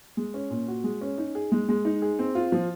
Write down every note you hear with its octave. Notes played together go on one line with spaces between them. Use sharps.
G#3
C#4
A#2
F#4
G#3
C#4
D#4
G#4
G#3
G#3
D#4
G#4
C4
F4
F3